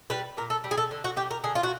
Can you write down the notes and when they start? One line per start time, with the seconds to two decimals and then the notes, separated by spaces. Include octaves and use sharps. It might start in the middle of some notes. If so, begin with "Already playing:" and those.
0.10 G3 B4
0.37 A#2 A#4
0.50 A4
0.64 G3
0.71 G#4
0.77 A4
0.91 D3
1.04 F#4
1.16 G3 G4
1.31 A#4
1.44 D3 G#4
1.55 F4
1.63 F#4